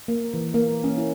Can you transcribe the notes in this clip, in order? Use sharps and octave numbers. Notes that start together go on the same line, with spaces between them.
A#3
E3
A#3
C#4
E4